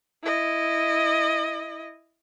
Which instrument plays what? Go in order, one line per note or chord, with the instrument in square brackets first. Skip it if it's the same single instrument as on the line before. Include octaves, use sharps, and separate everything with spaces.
[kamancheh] E4 D#5